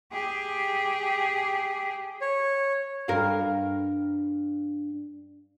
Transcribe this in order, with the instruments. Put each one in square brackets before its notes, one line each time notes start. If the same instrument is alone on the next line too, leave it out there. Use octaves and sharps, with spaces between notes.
[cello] G4 G#4
[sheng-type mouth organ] C#5
[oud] G2 A#4 F5